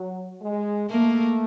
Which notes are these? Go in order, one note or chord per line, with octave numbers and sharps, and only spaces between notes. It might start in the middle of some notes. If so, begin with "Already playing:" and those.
Already playing: F#3
G#3
A3 A#3